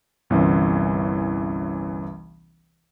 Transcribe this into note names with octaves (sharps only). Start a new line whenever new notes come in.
G1 C2 E3 C4 C#4